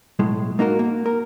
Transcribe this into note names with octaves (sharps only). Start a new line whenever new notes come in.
B1 A2 G#3
A#3 D#4 F#4 A#4
A#3
A#4